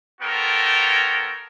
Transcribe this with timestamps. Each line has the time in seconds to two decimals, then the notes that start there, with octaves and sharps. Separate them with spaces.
0.21 B3 F4 A4 A#4 C#5 G5